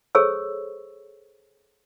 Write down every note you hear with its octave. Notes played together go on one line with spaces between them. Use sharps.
G#4 A4 C5 C#5 C#6 E6